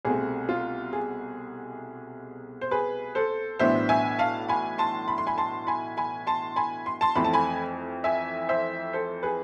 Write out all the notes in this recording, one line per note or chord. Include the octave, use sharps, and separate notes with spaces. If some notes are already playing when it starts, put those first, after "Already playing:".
C2 B2 A3 C4 G#4
F4
G#4
C5
G#4 B4
A4 C5
B1 A2 E3 B3 D4 C5 E5
E5 G#5
F5 A5
G#5 B5
A5 C6
B5
C6
G#5 B5
A5 C6
G#5 B5
G#5 B5
A5 C6
G#5 B5
C6
A5 C6
F2 E3 A3 C4 B5
A5
G#5 B5
E5 G#5
C5 E5
A4 C5
G#4 B4